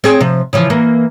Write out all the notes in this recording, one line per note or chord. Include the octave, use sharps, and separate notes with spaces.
C4 G#4 C#5
C3 F3
C#3 E3 F3
E3 A#3